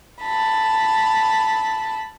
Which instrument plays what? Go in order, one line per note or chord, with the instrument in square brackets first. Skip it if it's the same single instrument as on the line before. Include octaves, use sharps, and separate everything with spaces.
[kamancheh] A5 B5